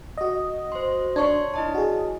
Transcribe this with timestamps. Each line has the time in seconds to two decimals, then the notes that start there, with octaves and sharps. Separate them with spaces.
0.17 F#4 D#5
0.72 C5 C6
1.16 D4 C#5 C6 C#6 G#6
1.54 E4 D#5 A5
1.74 F#4 G#4